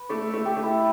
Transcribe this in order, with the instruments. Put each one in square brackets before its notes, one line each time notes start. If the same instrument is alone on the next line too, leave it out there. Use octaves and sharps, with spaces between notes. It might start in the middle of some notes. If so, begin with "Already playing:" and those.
Already playing: [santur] B4
[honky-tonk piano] A3 [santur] D5
[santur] E5
[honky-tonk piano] A3
[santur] G4
[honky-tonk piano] A3
[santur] E4